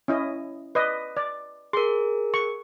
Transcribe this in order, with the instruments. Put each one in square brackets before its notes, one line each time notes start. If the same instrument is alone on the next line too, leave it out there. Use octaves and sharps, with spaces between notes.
[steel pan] C#4 E4 D#5
B4 D5 D#5
D5
[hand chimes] G#4 A#4 [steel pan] C6
[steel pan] C#6